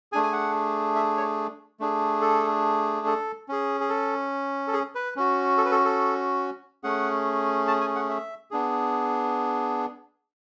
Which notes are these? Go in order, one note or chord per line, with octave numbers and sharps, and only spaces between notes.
A3 D4 G#4 G#5
G#5
F#5
E5
C#5
A3 D4 G#4
A4
A4
C#4 G#4
G#4
A4
A4
G#4
B4
C#4 F#4
A4
B4
A4
A4
A3 C#4 G#4 F#5
A5
G#5
F#5
E5
B3 D4 G#4